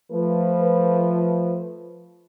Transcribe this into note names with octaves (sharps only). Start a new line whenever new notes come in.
F3 A3 B4